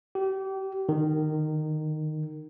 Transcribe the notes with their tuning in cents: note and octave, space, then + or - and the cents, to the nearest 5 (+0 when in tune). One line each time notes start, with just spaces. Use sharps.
G4 -30
D#3 -15